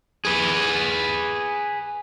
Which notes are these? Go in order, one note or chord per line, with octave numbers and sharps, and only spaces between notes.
G#4 B4